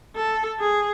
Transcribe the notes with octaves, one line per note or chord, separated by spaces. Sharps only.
A4
G#4